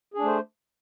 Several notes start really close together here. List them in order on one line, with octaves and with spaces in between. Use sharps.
G#4 D4 A3 C5